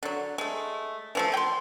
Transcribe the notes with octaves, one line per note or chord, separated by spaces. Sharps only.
D3 F#3
G#3 A3
E3 F3 A3
G5 C6